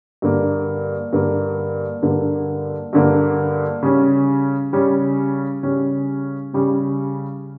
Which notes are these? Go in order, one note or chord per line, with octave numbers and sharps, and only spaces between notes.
G2 D3 A#3
G2 D3 A#3
G2 D3 A#3
G2 D3 A#3
C#3 G3 C#4
C#3 G3 C#4
C#3 G3 C#4
C#3 G3 C#4